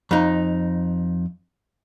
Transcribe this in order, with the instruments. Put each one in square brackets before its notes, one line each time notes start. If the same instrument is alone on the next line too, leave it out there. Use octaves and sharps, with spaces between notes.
[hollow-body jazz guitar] F2 D#4